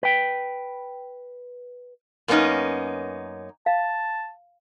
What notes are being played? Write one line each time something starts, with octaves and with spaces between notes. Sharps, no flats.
B4 G5
F#2 A#3 B3 C#4 D#4
F5 A5